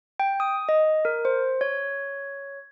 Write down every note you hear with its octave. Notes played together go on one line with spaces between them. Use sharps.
G5
D#6
D#5
A#4
C5
C#5